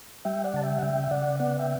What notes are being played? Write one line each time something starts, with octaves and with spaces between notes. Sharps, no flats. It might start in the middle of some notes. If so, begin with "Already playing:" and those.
G3 E5 G5
D5 F#5
C#3 A5
E5 G5
F#5
C#3 E5 G5
E5
C#3 D5 F#5
B3 D5 F#5
E5 G5